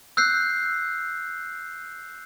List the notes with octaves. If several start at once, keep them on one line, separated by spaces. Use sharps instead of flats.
E6 F#6 G6 C7